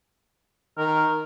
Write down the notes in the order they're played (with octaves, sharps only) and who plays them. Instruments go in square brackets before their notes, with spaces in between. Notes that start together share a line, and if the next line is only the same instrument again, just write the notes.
[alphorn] D#3 [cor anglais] A#4